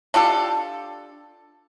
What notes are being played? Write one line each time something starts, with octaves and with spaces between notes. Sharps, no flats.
D4 F4 G4 A4